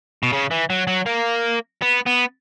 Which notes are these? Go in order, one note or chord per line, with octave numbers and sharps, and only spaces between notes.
B2
C#3
E3
F#3
F#3
A#3
B3
B3